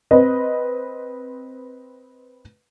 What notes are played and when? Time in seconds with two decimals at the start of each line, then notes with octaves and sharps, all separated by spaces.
0.11 C4 B4 D#5